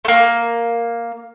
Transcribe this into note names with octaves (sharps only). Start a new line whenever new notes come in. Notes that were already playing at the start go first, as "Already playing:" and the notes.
A3 A#3